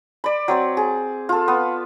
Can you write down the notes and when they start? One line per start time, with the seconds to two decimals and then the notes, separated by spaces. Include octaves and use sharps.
0.24 D5 B5
0.48 F#3 C4 D5
0.77 G#4
1.29 F4 A4
1.48 B3